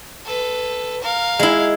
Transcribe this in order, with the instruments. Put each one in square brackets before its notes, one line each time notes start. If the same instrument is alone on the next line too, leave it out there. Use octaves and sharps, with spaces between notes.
[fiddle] A4 B4
A#4 F5
[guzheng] G#3 E4